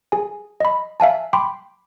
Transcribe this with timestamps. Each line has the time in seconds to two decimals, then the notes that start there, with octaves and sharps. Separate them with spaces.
0.12 G#4 G#5
0.60 D#5 B5
1.00 E5 F5 G#5 A5
1.33 G5 B5 C6 D6